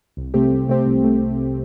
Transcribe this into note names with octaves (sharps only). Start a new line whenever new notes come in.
C2
C3 A3 C4 G4
C2
C3 A3 C4 G4
C2
A3